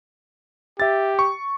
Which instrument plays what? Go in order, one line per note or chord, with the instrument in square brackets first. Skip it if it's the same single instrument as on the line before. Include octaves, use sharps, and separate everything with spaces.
[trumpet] G4 [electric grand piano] E5 A6
[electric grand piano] C#6